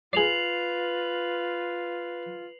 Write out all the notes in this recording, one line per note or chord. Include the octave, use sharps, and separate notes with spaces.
F4 G#4 B4 D5 C7 F7 F#7